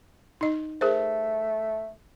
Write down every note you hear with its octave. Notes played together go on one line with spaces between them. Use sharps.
D#4 D#5
A3 G#4 A#4 C5